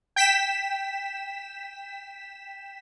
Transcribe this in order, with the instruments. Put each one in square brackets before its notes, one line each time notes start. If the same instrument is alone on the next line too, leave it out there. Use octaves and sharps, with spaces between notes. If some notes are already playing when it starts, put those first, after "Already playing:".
[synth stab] G5 B6 E7